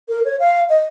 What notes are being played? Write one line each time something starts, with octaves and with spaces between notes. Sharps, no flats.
A#4
C#5
F5
D#5